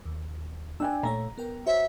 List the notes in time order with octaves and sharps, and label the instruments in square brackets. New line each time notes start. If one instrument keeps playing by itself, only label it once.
[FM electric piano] D#2
[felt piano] D4 G5 G#5 [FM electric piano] E6 F#6
[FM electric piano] A#2 A3 C#5 [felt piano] A#5
[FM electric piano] B3 A#4 G5
[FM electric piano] F#4 C5 C#5 [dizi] E5